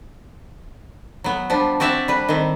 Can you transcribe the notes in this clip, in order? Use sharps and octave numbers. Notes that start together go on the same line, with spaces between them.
F#3 B3
F3 G3 D4
C4 F#4 D5 E5 A5
G3 B4
D#3 C4